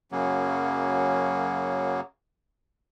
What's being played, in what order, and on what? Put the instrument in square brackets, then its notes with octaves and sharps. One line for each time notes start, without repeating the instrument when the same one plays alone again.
[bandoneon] F#2 C#3 F#3 A#3